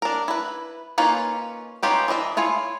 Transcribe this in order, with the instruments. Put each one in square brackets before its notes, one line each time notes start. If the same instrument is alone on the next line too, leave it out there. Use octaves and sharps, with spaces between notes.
[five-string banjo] D4 A#4
E4 B4
A#3 C#4 D#4 F4 B4
C#4 D#4 F4 G4 B4
E3 D4 D#5 E5
E4 F4 C#5 G#5